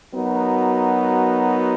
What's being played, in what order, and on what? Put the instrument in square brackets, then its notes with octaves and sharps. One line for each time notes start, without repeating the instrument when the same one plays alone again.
[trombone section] F#3 B3 D#4 F#4 A#4